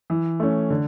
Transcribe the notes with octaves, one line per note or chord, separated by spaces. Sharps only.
E3
A3 C#4
D3